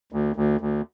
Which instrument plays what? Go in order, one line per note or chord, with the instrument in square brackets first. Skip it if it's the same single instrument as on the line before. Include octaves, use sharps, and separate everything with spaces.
[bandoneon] D2
D2
D2